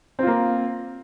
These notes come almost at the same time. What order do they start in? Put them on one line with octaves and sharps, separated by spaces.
C4 F4 A#3